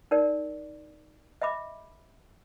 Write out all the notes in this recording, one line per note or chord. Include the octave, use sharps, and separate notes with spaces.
D#4 A#4 D5
D#5 E5 B5 D6